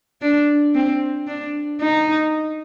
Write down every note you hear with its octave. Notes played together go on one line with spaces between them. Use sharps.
D4
C4
D4
D#4